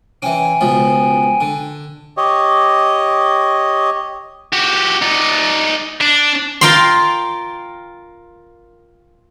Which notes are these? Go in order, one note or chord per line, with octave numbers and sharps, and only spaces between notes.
E3 C#4 G5 G#5
C#2 B2 F3
D3
G4 C#5 D#5
F#4 G4
D#4 D5
D4
F4 A#4 F5 G5 C6